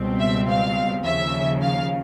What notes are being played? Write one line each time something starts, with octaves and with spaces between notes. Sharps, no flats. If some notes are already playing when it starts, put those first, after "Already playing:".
Already playing: C#2 B2 G3 C4
E5
F5
D#2 C#3 F3 E5
F5